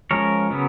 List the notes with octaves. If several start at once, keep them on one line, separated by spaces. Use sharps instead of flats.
F3 G#3 C#4 A#4 C#5
C#3 F#3 B3